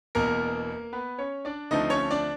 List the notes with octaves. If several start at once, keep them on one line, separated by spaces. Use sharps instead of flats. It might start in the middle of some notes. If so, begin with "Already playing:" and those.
E1 E2 B2 A#3 A#4
B3 B4
C#4 C#5
D4 D5
D2 D3 F3 A3 C4 D#4 D#5
C#4 C#5
D4 D5